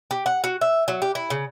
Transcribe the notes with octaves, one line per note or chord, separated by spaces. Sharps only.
G4
F#5
F#4
E5
F#3
G4
E4
C#3